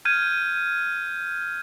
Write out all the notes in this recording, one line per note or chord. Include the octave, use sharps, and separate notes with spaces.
F6 G6 G#6 D#7